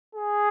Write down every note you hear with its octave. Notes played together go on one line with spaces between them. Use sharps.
G#4